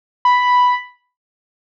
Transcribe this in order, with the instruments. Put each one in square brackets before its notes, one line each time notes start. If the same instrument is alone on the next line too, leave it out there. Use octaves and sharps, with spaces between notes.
[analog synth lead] B5